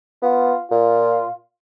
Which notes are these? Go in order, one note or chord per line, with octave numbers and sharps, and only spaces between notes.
B3 F4
A#2 F4